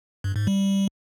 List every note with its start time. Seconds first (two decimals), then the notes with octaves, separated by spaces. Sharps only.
0.24 G2
0.36 G#2
0.47 G3